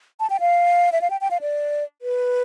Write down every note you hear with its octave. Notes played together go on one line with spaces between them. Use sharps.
A5
G5
F5
E5
F5
G5
G5
F5
D5
B4